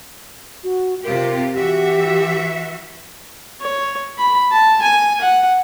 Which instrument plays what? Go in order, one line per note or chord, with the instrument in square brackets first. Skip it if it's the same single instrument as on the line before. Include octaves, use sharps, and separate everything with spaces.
[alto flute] F#4
[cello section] C3 F4 G4 [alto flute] A#4
[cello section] E3 F#4 E5 [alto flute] G4
[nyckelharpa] C#5
B5
A5
G#5
F#5